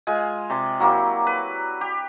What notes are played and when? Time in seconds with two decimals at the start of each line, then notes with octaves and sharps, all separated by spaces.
0.07 G#3 F4 G#5
0.50 C3 D5 C6
0.80 F#3 A#3 E4 G4
1.27 B4
1.81 G4